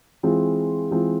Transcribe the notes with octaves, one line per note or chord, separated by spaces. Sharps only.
E3 G#3 C4 F4
E3 G#3 C4 F4